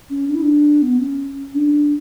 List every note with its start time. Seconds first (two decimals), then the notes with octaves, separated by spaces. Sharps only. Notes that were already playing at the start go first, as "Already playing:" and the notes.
0.10 C#4
0.28 D4
0.35 E4
0.42 D4
0.82 B3
1.00 C#4
1.55 D4